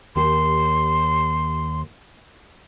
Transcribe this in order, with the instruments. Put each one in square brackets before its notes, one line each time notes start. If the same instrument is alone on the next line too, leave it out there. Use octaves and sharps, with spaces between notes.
[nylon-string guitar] D#2 G4 [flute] C6